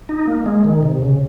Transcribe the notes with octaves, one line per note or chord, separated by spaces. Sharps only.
D#4
A#3
G#3
D#3
C3
C#3